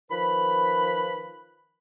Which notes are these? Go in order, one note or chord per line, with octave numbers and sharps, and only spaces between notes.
D#3 F3 B4 B5